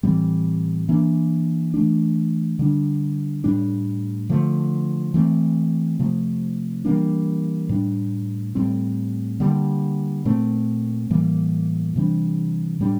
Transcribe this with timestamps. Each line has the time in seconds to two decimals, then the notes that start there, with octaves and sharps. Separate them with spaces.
0.03 A2 E3 G3 C4
0.89 E3 A#3 D4
1.74 E3 A3 D4
2.59 D3 G3 D4
3.44 A2 G3 D4
4.29 D3 F3 A3
5.14 E3 A3 C4
5.99 C3 F3 A3
6.85 E3 G3 A#3 D4
7.69 A2 G3 D4
8.55 A2 G3 C4
9.40 D3 G3 A#3
10.25 A#2 A3 C4
11.10 A2 E3 G3 A#3
11.96 C3 E3 G3 D4
12.80 A2 G3 D4